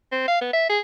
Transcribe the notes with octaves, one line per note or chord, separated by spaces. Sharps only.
C4
F5
B3
E5
G#4